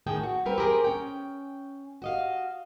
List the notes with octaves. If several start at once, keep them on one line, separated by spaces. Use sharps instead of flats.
F#2 A2 D#3 G#4 G5 A5
F#4
G3 C4 A#4 B4
G4 G#4 A#4 C5
C#4 G5
F#4 D#5 F5